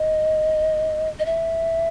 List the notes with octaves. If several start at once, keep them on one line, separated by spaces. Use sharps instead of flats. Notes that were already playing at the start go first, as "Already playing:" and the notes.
Already playing: D#5
D#5
E5